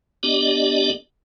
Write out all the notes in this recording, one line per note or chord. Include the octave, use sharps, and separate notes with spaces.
B3 D4 G4 D5 D#5